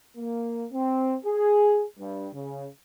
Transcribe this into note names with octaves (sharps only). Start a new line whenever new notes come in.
A#3
C4
G#4
G2
C#3